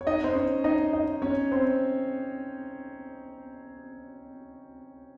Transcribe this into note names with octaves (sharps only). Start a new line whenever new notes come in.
C#5
D#4 D#5
C5
C#4 C#5
D#4 D#5
D#4 D#5
C#4 C#5
C4 C5